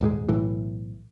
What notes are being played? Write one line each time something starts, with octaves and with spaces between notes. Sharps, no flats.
D#1 G#2 G3 G#3
B1 A2 E3